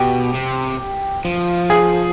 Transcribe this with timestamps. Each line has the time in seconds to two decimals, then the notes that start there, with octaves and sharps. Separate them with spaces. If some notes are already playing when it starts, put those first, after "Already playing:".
Already playing: B2 G4
0.34 C3
1.25 F3
1.70 G#4